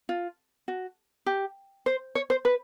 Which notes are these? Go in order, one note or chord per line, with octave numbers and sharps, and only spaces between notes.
F4
F#4
G4
C5
C#5
C5
B4